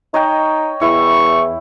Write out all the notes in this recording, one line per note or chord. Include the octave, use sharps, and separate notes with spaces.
D#4 C#5 D#5 G5
E2 E4 C#6